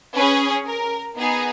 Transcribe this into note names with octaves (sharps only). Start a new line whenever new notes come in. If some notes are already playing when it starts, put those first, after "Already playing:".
C#4 G#4 B4
A#4
B3 D#4 G#4